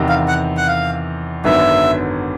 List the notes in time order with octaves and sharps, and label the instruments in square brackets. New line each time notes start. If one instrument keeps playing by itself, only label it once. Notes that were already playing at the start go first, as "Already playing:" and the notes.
Already playing: [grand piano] E2 C3 D#3
[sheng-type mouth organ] F5
F#5
F#5
F5
[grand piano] G#1 F#2 D3 F#3 B3 [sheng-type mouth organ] E5